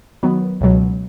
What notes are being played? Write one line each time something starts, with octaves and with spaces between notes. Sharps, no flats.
D#3 F#3 B3
C#2 B2 F#3